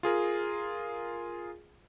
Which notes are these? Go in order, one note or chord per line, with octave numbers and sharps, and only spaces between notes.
F4 G#4 A#4